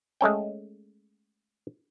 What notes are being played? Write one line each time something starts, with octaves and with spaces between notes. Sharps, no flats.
G#3 A3 C#4 G5